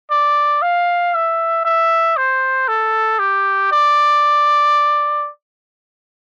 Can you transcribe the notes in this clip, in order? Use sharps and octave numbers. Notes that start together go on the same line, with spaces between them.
D5
F5
E5
E5
C5
A4
G4
D5